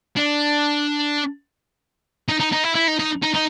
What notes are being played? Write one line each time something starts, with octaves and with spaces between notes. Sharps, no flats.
D4
D#4
D#4
D#4
E4
E4
D#4
D#4
D#4
D#4